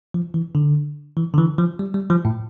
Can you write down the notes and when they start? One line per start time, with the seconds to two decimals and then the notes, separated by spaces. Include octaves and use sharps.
0.14 F3
0.34 E3
0.55 D3
1.17 E3
1.34 D3
1.38 E3
1.58 F3
1.79 G3
1.94 G3
2.10 F3
2.25 A2